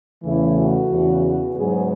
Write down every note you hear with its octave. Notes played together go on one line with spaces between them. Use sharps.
E2 C#3 E3 A3 E4
F#4
E2 C#3 E3
G#2 F#3 B3 G#4